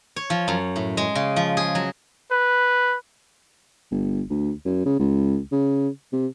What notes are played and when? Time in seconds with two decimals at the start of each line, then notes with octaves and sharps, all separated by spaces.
0.16 C#5
0.30 F3
0.48 F#2
0.76 A2
0.97 G#3
1.15 C#3
1.36 F3
1.57 G#4
1.75 F#3
2.31 B4
3.91 G1
4.30 D2
4.65 F#2
4.85 C#3
4.99 C#2
5.52 C#3
6.13 C3